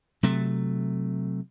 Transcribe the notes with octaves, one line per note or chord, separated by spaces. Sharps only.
C3 F#3 A3